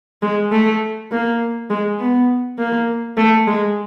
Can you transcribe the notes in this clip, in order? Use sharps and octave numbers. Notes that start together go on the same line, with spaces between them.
G#3
A3
A#3
G#3
B3
A#3
A3
G#3